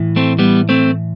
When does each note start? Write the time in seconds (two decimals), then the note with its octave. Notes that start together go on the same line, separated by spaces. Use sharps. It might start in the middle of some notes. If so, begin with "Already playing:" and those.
Already playing: A2 E3
0.16 A3 C4
0.39 G3 B3
0.69 A3 C4